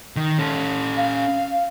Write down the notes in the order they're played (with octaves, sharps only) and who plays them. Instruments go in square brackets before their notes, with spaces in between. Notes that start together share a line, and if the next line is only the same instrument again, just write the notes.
[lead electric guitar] D#3
C#4 A4
[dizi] F5